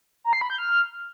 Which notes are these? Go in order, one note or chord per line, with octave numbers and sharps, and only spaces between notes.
A#5
C7
B5
G6
F6